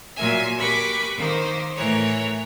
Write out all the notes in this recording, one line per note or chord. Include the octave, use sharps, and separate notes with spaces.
A#2 F#3 A#4 E5 G#5
G4 A#4 B4 B5 C#6 D6
D#3 A#3 C5
A2 E3 A#4 C#5